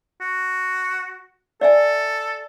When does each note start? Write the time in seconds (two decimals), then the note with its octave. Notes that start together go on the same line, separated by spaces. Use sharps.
0.21 F#4
1.61 A4 D5 E5 G#5